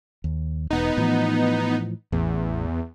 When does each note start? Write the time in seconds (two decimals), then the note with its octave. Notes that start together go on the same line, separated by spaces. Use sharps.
0.24 D#2
0.70 E1 B3 D#4
0.97 A2 E3 F3
2.12 A1 E2